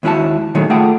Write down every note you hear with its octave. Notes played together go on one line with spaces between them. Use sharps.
D#2 G#3 D4 E4 F#4 A5
A#2 D#3 F#3 G#3 A3
A3 A#3 F4 G#4 F#5 G5